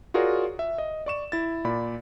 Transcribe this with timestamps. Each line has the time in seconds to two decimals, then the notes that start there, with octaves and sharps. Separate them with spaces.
0.14 F4 F#4 G#4 A#4 C#5 D5
0.59 E5
0.78 D#5
1.06 D5 C#6 E7
1.32 E4 A6
1.65 A#2 D5 B5